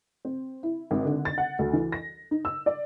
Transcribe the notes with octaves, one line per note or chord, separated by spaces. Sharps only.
C4
E4
G#1
D3
A6
F#5
D2
E3
A#6
D#4
E6
D5